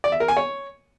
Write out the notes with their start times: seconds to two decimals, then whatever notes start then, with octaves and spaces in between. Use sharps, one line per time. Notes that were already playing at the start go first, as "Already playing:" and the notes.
0.04 D5
0.12 E5
0.20 A#4
0.28 G#5
0.37 C#5